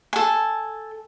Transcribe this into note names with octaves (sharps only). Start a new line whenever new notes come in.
A4 G#5